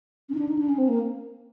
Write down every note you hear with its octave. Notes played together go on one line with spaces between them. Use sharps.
C#4
D#4
D4
D#4
D4
C#4
C4
A#3